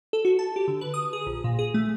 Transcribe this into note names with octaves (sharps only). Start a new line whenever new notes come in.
A4
F#4
A5
G4
D3
B4
D#6
G#4
A#1
A#2
G#4
A3